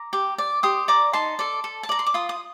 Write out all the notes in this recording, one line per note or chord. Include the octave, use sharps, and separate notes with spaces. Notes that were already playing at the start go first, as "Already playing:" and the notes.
Already playing: A#5 D6
G4
D5
G4 C6 D#6
D5 A#5 D6
D#4 A5 C6
A4 D5
A4
A5
D5 A#5
C6
D6
F4 C6 D#6
D#6